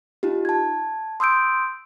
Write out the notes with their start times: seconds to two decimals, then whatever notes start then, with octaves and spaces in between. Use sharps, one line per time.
0.23 D#4 F4 G4
0.45 A5 G#6
1.20 C6 D#6 E6 G6 D7